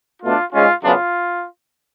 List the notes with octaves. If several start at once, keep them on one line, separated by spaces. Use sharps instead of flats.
B2 A3 D4 F4
G#2 G#3 C#4 F4
F#2 C#3 F#3 B3 D4 F4